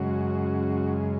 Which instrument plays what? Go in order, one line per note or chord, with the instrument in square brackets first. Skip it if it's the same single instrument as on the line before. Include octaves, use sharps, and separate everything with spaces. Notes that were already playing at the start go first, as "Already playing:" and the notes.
Already playing: [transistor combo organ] F#2 C#3 G#3 F#4